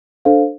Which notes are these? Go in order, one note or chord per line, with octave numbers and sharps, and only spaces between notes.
D4 A4 C5 F5